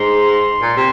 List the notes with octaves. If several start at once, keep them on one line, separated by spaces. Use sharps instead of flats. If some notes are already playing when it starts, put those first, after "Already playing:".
Already playing: G#2 C6
A#2
C3